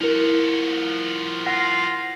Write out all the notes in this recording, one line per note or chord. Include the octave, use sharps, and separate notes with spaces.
F3 E4 F#4 A#4
F4 F#5 C6 A#6